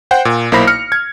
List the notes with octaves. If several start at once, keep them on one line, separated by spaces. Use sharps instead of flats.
C5 F#5 G5
A#2
B1 A#3 E4 C5 B5 A#6
F6 C#7
G#6